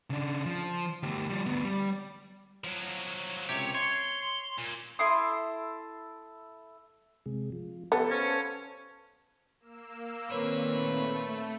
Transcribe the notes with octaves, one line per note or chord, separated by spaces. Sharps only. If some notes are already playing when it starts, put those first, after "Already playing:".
C#3 D4
F3
D2 G4
F3 G3
D2 B3
G3
F3 F#3
C#2 C3 G4 C#5
C#5 C6
A#2
E4 A4 C6 D#6
C3 G#3
F3
B3 G4 A4
C#4 B4 C5 F5
A#3 E6
A#2 D#3 C4 B4 C#5
A3